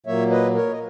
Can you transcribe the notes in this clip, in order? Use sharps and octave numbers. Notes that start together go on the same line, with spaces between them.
A#2 F#3 A#3 C#5 E5
B4 D#5
A#4 C#5
D#5